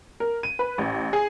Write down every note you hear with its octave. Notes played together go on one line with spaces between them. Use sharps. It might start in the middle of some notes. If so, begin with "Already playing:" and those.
A#4
D#7
B4
A1
G#4